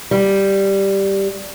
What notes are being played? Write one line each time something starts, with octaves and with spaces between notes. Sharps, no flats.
G3